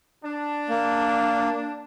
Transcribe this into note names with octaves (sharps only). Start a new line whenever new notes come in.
D4
A#3